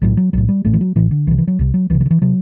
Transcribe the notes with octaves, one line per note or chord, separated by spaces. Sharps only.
B1 A2 F#3
F#3
B1 A2 F#3
G3
A1 A2 A3
E3
F#3
A1 A2 E3
D3
C2 C3 E3
E3
F#3
C2 C3
F#3
C2 C3 E3
E3
D3
E3
C3 F#3